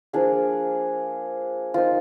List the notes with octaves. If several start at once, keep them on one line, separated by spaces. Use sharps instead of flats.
F3 A#3 D4 F4 G#4
F3 A#3 D#4 F4